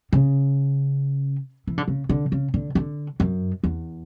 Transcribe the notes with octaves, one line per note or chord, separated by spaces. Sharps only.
C#3
E3
D3
C#3
D3
C#3
D3
D3
F#2
E2